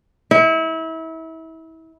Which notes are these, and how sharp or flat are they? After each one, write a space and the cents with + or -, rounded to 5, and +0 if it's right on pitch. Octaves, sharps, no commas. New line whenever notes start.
E4 -30